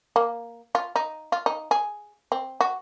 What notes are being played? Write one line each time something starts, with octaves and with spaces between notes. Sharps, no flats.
A#3
F4
D#4
F4
D#4
G#4
C4
F#4